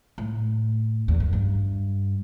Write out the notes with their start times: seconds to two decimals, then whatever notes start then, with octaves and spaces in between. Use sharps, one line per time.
0.18 A2
1.08 E2
1.20 F#2
1.33 G2